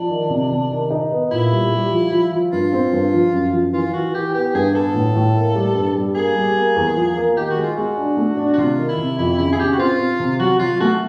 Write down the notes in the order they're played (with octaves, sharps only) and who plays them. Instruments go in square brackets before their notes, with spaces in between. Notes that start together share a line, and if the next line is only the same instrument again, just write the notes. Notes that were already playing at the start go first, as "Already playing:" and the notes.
Already playing: [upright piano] F3 [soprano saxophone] D4
[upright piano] D#3
C3
C3
D#3
D#4
B3
[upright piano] A#2 [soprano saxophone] E4
[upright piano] G3
G3
F3
F3
F3
[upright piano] G2 [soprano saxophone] F4
[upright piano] C4
G2
F3
F#2
F3
[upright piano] E3 [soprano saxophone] F4
[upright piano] E3 [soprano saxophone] F#4
[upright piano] E3 [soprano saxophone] G4
[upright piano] B3 [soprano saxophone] G4
[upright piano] G2 [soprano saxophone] G#4
[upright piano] B3 [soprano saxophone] A4
[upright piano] A2
A2
A#3
G3
G2
G3
[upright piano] A#3 [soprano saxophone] G#4
[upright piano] G3
A#3
E2
F3
A#3
[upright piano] D#3 [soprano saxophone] G4
[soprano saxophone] F#4
[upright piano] G#3
[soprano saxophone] F4
[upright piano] G#3 [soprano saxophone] F#4
[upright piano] D4
A3
D4
[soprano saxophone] F#4
[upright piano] C3 [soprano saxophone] F4
[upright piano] D#3
[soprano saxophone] E4
[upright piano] C3
[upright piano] F2 [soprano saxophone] E4
[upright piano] C#3 [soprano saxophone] E4
[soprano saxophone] G#4
[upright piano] C#3 [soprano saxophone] G4
[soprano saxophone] F#4
[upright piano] C4 [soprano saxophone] F4
[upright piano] C4
C3
[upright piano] F#3 [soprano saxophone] F#4
[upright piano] F#3 [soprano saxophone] F4
[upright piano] A3 [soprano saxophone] F#4